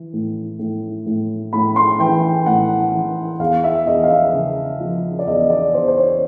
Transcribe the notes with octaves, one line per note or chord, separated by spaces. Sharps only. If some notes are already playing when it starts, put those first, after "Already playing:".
Already playing: E3
A2
A2
A2
A2 B5
C6
E3 G5
A2 F#5
E3
E2 F5
E5
E2 D#5
F5
E5
C#3
F3
D5
E2 D#5
D5
E2 C5
C5
C#5